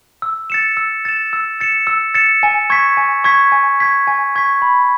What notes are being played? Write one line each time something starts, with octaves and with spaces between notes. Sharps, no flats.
E6
A6 C#7 E7
E6
A6 C#7 E7
E6
A6 C#7 E7
E6
A6 C#7 E7
G#5
C#6 G#6 B6
G#5
C#6 G#6 B6
G#5
C#6 G#6 B6
G#5
C#6 G#6 B6
B5